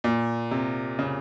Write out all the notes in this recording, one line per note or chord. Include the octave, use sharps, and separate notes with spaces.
A#2
C3
C#3